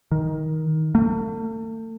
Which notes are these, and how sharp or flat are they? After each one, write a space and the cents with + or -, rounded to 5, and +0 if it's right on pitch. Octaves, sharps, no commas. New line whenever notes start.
D#3 +15
A3 +40